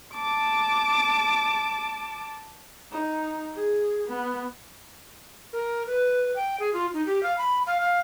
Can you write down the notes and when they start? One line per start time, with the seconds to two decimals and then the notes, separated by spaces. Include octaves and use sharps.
0.14 A5 D6
2.92 D#4
3.55 G#4
4.08 B3
5.53 A#4
5.87 B4
6.36 G5
6.60 G#4
6.74 F4
6.94 D#4
7.06 G4
7.23 F5
7.38 B5
7.67 F5
7.80 F5